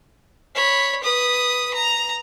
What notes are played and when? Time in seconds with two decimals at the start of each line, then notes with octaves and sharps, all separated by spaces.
0.55 C#5 B5
1.03 B4 D#6
1.74 A#5